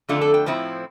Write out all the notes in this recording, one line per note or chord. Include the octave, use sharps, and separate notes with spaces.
F2 D3 A3 D4 F4
A4
G5
A2 F3 C4 E4